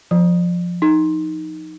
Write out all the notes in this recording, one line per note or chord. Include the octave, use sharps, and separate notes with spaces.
F3
D#4